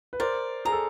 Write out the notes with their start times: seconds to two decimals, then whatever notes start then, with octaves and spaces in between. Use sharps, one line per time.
0.13 B4
0.20 A#4 C5 D5
0.65 G#4 A#5
0.72 A4